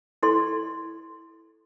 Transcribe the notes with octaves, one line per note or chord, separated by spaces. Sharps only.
E4 A4 D5 C6